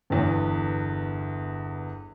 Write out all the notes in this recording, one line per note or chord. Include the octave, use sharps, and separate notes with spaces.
G1 E2